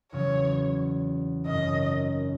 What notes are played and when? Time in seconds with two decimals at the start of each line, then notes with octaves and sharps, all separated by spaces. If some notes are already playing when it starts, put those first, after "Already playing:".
0.12 E2 C#3 F#3 C#5
1.46 G#1 F#2 C#3 D#5